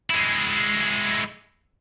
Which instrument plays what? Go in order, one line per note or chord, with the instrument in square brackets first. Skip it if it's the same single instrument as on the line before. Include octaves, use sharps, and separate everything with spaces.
[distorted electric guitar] G#3 E4